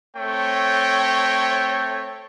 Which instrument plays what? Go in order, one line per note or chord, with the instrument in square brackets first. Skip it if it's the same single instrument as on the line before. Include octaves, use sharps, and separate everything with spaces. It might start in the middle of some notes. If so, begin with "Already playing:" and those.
[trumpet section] A3 C4 C#5 G5